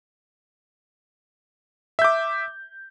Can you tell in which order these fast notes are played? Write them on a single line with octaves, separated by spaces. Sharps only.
E5 G6 D6